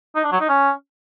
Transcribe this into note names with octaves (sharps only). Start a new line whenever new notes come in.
D#4
D4
F#3
D#4
C#4